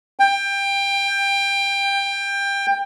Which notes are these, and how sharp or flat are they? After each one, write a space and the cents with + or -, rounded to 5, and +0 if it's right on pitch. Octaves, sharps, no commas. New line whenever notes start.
G5 +20